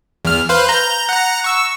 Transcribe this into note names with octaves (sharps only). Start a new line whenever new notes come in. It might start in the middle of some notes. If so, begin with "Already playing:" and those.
E2 F6
B4 C5 F5
A#5 G6
F#5 A#5
C#6 E6